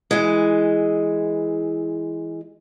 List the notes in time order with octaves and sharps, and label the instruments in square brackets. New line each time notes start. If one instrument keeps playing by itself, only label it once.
[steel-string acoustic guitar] E3 G#3